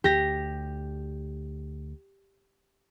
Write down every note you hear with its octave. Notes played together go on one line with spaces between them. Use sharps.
D2 G4 A#6